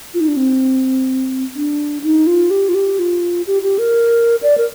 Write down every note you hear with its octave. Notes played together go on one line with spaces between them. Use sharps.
F4
D#4
D4
C4
D4
D#4
F4
G4
F4
G4
F4
G4
G4
A#4
D5
A#4